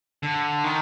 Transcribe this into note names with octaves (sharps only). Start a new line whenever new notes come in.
D3
D#3